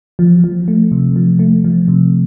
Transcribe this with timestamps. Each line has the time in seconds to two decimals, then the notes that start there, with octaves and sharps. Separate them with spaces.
0.19 F3
0.44 F3
0.68 A3
0.92 C3
1.16 F3
1.39 A3
1.64 F3
1.88 C3